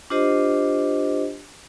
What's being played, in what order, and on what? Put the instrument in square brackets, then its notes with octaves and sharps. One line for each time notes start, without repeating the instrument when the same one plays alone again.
[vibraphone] D4 F4 G4 C5 D#5